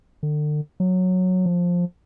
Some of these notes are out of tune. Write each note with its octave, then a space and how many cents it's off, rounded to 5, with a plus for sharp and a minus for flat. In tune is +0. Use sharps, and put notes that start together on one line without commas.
D3 +35
F#3 -10
F3 +10